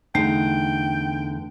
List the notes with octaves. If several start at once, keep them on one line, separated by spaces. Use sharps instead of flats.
E2 D3 A3 D#4 G5